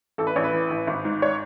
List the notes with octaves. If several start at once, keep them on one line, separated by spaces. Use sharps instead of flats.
A1 A4
B4
A1 C#5
B4
E3
A1
G#1
G#2
C#5